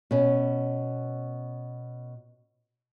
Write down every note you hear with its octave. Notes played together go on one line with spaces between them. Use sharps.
B2 C#4